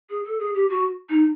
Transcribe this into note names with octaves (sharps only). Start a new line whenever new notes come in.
G#4
A4
G#4
G4
F#4
D#4